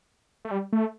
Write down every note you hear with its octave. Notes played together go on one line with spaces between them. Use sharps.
A3
G3
A3